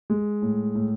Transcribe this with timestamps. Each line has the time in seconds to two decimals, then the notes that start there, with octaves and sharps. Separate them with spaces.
0.10 G#3
0.42 A2
0.75 A2